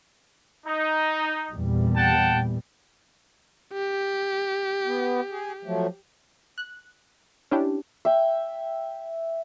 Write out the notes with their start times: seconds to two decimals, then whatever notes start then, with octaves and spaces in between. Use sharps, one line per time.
0.66 D#4
1.53 E2 A#2 G3
1.96 F#5 G5 A5
3.73 G4
4.85 B3
5.31 G#4
5.65 F3 F#3 A3
6.58 F#6
7.51 C#4 D4 E4 G4
8.05 E5 G5